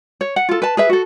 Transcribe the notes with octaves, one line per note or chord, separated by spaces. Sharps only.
C#5
F#5
F4 A4
B4 A5
G#4 B4 E5
F#4 A4